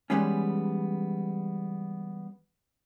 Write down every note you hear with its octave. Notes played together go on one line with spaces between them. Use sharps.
E3 F3 G3 G#3 B3 C#4